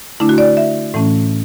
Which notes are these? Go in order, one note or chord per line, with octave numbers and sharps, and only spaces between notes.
D3 A3 D4 E4
F#4
D5
E5
A2 E3 A3 C#4